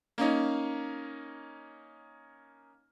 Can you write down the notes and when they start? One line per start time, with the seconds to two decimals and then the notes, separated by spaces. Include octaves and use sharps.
0.18 A#3 C#4 D#4